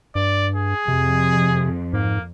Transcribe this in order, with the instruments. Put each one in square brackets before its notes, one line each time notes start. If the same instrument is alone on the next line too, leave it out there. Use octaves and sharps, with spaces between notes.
[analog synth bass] G2 [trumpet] D5
[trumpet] G#4
[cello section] F2 [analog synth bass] C3
[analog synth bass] G#2 [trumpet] A#3